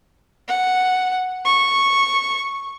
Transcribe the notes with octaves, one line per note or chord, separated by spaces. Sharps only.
F#5
C#6